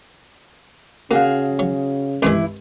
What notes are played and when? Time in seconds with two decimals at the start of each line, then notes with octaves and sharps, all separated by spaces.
1.11 C#3 A#3 F#4 G#4 F5
1.59 F#3
2.22 C2 G2 E3 G#3 E4